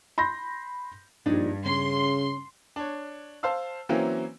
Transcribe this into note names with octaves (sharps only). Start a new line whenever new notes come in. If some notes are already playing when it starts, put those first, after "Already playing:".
B5 C6 G6 A#6
A#1 G2 D4 D#4
C#3 C#4 C6
D4 C#5
C5 F5 A5 E6
E3 F#3 A#3 C4 C#4 E4